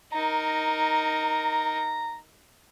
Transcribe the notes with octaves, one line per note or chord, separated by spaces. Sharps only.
D#4 A#4 A#5